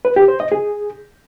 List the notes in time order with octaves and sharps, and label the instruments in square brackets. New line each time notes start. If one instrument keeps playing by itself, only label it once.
[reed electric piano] B4
G4
C5
D#5
G#4